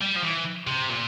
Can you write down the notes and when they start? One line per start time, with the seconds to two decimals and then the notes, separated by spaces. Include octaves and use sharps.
0.01 G3
0.16 F3
0.23 E3
0.67 C3
0.89 A#2